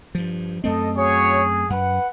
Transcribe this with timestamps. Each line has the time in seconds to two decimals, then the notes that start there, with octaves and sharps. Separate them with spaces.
0.15 G2 F3
0.64 F#2 A3 C4 A4 D#5
0.96 F#4 G#4 C#5
1.70 F#2 B4 F#5